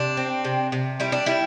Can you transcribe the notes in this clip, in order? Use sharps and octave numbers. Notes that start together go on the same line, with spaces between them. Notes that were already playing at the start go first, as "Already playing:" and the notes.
Already playing: C3 D4
C4
C3
C3
G3 E4
D4
G3 E4